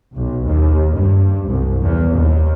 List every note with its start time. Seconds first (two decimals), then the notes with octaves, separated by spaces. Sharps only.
0.15 B1
0.45 D#2
0.94 G2
1.48 C2
1.82 E2
2.14 D#2